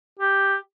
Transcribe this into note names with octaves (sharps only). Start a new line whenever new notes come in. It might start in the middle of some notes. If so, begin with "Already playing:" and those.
G4